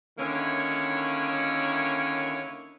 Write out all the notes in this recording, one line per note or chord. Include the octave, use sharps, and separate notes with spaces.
D3 D#3 A#3 C#4 E4 C#5